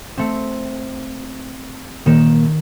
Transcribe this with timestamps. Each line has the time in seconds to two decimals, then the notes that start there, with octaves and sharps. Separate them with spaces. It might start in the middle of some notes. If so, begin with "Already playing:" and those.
0.18 A3 C4
2.06 A#2 D#3 A#3 E7